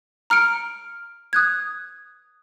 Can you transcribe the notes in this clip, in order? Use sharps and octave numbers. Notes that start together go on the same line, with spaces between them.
A#5 F6 C#7 D7
D#6 F#6 G#6